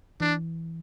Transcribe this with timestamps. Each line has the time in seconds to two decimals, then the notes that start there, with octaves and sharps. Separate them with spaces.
0.21 E3 D4